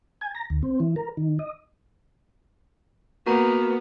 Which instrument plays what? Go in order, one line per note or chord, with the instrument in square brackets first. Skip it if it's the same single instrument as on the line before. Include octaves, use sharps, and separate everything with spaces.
[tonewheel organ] G#5
A#5
D2
C4
E3
A#4
D#3
D#5
[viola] A#3 B3 [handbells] F#4 A#4 A#5